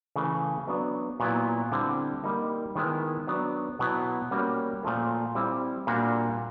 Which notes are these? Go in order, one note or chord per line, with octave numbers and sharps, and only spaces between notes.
C#3 E3 A3
F#3 B3 D4
A#2 F#3 B3 E4
D3 G3 C4 E4
G3 A#3 D#4
D#3 G#3 B3 E4
F#3 B3 D4
B2 F#3 B3 E4
G3 A#3 C#4 F#4
A#2 F3 A3
G3 C4 E4
A#2 G3 A#3 D4 F#4